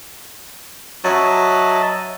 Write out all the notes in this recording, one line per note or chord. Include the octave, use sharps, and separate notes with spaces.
F#3 D#5 E5 A5